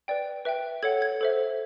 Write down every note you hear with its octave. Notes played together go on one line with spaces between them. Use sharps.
B4 D5 G5
B4 E5 G5
A4 C#5 F#5 G#6
G#6
A4 C5 E5